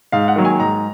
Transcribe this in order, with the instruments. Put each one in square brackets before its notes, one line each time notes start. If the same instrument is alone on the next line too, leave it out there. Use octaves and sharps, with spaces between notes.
[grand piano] G#2 F5
F#5
D#3 F#3 A#3
G#5
G#2 A#5